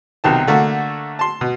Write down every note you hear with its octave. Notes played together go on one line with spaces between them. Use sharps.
B1 C3 D#3 A5
D3 A3 A#3 F#4
A5 C6
B2